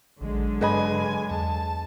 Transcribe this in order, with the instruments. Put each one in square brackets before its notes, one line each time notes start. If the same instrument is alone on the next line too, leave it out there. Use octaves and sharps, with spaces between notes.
[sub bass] A1 [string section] D3 F#3 G#3
[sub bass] G2 [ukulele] B4 D#5 B5 [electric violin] G#5
[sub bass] E2 [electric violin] A5